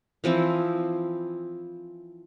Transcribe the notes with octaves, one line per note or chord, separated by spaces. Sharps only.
E3 F3 C4 E4